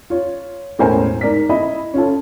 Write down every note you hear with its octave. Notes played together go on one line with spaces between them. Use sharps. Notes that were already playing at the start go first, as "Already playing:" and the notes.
F4 C#5
E1 A2 C#4 A#4 C5 G#5
G#2 A#4 D5 B6
E4 D#5 E5 B5
C#4 F4 A4